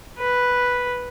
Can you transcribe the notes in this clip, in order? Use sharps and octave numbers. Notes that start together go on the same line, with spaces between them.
B4